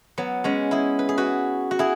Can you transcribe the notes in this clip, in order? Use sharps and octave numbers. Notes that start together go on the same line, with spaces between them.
F#3 B3
G#3 C#4
E4 G#4
B4
G#4
F#4 B4
F#4
E4 G#4